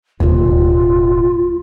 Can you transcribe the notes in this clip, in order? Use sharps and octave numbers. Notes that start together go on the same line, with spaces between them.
E1 A1 D#2 F4